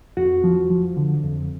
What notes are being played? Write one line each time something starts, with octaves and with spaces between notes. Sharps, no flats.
F2 F#4
F3
F3
D3
F2